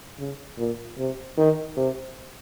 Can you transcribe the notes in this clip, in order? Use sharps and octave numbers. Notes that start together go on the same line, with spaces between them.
C#3
A#2
C3
D#3
C3